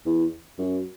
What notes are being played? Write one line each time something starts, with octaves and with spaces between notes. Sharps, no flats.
E2
F#2